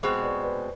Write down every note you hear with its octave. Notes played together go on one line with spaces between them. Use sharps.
B2 G#3 C4 G#4 C5
B4 D5
C5
B4 D5